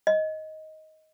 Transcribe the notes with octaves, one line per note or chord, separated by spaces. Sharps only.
D#5